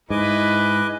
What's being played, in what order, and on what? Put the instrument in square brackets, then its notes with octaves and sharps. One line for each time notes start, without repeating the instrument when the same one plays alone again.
[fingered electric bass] G#2 [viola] E4 [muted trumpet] B4 [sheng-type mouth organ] D#5 G#5 D6